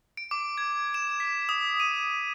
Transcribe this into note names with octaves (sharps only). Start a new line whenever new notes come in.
D7
D6
G#6
E7
B6
D#6
D#7
D#6